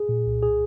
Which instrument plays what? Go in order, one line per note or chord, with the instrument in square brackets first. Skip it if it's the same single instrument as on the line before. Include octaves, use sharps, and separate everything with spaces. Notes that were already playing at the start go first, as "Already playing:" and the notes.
Already playing: [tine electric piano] G#4
A#2
C2
G#4